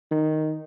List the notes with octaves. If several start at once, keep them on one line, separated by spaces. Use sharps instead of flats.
D#3